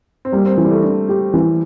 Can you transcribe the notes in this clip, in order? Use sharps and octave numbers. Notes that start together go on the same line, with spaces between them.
C4
G3 A#3
C4
E3
G3
A3
D4
G4
E3